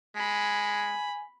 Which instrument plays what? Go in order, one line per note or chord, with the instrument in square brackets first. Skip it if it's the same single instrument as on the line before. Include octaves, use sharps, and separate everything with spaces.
[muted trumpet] G#3 [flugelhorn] G#5 [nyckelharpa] B5